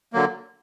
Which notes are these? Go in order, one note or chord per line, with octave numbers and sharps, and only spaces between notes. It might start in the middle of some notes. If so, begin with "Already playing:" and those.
D3 F#3 A#3